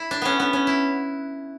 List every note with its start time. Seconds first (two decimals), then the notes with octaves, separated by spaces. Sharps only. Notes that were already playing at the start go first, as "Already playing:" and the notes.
Already playing: E4
0.11 D4
0.22 B3 C#4
0.40 B3
0.53 C#4
0.67 E4